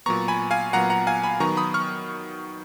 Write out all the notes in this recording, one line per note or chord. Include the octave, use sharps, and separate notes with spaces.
A#2 F#3 B3 A#5 C#6
G#5 B5
F5 G#5
A#2 F#3 B3 F#5 A#5
F#5 A#5
F5 G#5
G#5 B5
D#3 F#3 B3 A#5 C#6
B5 D#6
C#6 F6